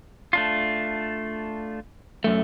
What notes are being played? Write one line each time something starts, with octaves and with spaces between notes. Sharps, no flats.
A3 D4 F4
F#2 A3